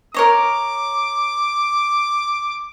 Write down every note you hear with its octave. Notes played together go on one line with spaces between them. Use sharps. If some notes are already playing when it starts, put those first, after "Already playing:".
A#4 C#5 D#5 D6